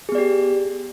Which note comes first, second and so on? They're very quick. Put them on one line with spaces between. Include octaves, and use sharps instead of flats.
G#4 B3 D5 G4